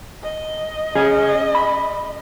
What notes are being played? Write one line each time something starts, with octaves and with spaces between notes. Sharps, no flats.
D#5
C#4 G#4
B5